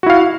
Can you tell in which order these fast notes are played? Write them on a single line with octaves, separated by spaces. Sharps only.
F#4 E4 F5